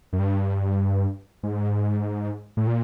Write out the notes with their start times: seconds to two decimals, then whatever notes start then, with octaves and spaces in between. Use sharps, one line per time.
0.13 F#2
0.19 G2
1.43 G#2
2.57 A2
2.67 A#2